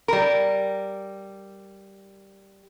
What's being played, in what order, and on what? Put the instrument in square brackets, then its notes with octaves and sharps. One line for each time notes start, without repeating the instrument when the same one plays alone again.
[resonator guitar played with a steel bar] G3 A#4